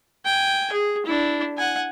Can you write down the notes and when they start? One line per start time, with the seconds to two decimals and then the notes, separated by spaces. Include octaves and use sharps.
0.25 G5 G#5
0.72 G#4
1.06 D4 E4
1.58 F#5 G#5